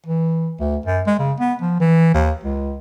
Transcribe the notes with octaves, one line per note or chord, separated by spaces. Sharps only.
E3
D2
F#2
G#3
C#3
B3
F3
E3
D#2
C#2